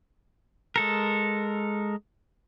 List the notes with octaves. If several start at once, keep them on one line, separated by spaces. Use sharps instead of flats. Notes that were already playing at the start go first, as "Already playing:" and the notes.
G#3 A4 A#4